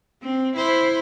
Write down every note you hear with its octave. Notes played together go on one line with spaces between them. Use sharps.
C4
E4 C5